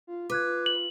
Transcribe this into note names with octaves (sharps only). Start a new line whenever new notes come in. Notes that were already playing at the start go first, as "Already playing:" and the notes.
F4
F4 B4 D6 F#6 G#6
F4
F#7